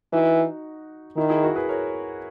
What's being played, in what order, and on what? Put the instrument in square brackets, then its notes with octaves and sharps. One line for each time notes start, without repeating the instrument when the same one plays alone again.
[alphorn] E3 [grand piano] D#4 F#4
[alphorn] D#3 [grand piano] E4
[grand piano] E4 G#4
F#4 A#4
G#4 B4
A#4 C#5